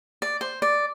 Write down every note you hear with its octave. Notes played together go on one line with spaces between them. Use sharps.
D5
C5
D5